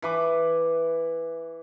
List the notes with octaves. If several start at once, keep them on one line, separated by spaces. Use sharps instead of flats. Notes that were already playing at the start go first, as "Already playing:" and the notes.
E3 B4 D6